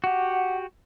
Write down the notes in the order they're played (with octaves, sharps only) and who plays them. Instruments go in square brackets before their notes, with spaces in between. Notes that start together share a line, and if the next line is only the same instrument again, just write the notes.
[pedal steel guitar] F#4 G4 [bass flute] F#5